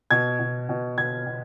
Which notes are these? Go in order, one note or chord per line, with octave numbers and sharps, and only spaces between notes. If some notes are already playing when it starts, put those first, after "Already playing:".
B2 G#6
B2
B2
B2 G#6
B2